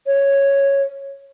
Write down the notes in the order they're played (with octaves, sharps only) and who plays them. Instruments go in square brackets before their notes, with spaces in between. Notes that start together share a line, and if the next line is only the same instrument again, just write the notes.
[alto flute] C#5